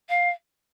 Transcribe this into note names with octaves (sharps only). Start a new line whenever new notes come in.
F5